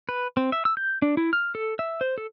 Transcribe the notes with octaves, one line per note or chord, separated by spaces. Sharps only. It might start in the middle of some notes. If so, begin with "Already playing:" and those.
B4
C4
E5
E6
G6
D4
E4
F6
A4
E5
C5
A4